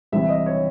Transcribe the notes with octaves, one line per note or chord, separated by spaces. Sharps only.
C2 C3 E3 E5
D#5
C#5